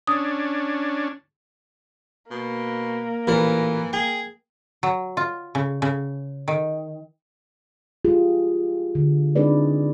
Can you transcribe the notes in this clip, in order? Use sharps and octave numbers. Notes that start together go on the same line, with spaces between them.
C#4 D4 D#6
B2 A#3
A1 A#2 E3 A#4
G#4 G5
F#3
F4
C#3
C#3
D#3
F4 G4 G#4
D3
C4 D4 D#4 G#4 B4 D5